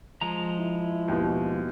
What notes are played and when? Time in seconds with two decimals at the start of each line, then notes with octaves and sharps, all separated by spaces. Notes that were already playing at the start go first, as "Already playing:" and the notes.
0.21 F3 G#3 A#5
0.60 E4
1.08 D#2 B2